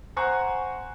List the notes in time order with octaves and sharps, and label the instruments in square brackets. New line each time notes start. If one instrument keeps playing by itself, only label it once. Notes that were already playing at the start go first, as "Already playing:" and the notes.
[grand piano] C5 F#5 G#5 A#5 C#6 F#6